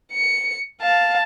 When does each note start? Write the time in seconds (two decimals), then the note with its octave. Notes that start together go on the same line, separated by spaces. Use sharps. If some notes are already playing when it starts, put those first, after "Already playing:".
0.12 C#7
0.82 F5 A5